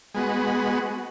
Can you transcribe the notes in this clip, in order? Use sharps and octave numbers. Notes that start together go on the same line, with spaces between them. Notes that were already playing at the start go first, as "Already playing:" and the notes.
G#3 B3 F#4